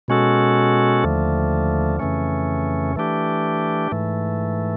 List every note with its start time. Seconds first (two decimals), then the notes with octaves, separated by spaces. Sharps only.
0.08 B2 G#3 C#4 F#4 A4
1.04 D#2 D3 F3 A3
1.99 F2 C#3 E3 A3 C#4
2.96 E3 A3 D4 G4
3.92 G#2 E3 A3